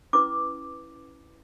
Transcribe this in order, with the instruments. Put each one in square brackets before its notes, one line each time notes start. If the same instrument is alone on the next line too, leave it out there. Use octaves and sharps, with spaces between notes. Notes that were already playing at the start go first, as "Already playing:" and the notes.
[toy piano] C#4 E4 B4 D6